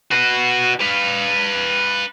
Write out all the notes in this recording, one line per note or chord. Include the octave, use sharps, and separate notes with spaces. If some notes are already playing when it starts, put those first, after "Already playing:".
F#4 B4
B4 F5